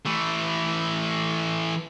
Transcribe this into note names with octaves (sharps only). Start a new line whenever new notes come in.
E3 A3